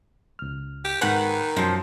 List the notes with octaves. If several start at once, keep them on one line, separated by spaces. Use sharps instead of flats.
C#2 F6
G4
G#2 D#3 B4 F#5 G#5
F#2 F3 F#3 C4